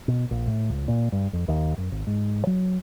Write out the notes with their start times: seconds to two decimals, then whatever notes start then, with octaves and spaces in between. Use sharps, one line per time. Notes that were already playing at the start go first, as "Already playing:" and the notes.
0.08 B2
0.31 A#1
0.47 A2
0.70 C#2
0.88 A#2
1.12 G2
1.33 F2
1.48 D#2
1.78 F#2
1.92 G#1
2.07 G#2
2.47 F#3